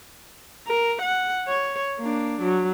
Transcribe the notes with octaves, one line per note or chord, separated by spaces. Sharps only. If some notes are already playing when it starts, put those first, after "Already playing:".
A#4
F#5
C#5
A#3 D4
F#3